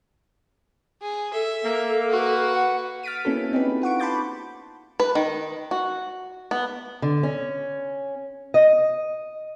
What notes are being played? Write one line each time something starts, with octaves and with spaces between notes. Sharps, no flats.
G#4
A4 E5
A#3
F#4 B4
F#5
F6 A6 B6 D7 D#7
A#3 B3 C#4 E4 F#4 A4
C4 D#4 G4 G#4 B4
F4 F#5 C#6 D7
A5 B5 C6 D6 G6 A6
B4
D#3
F#4
B3
D3
C#4
D#5